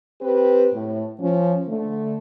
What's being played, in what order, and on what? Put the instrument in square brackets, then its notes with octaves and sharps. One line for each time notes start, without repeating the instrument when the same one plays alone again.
[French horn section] C4 G4 B4
A2
F3 C#4
D3 A3